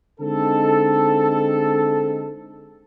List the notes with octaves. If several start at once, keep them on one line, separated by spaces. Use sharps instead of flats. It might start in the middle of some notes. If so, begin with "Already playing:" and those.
D3 G#3 C4 D#4 A4